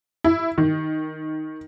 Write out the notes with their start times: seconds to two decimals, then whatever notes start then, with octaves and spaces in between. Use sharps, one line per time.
0.24 E4
0.58 D#3